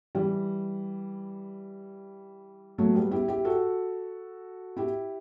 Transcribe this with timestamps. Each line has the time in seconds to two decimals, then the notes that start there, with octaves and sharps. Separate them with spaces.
0.15 E3 G3
2.78 F#3 A3
2.95 G3 B3
3.11 E4 G4
3.28 E4 G4
3.45 F#4 A4
4.77 E4 G4